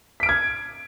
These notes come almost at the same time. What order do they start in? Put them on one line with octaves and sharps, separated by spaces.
B6 D7 F6 G#6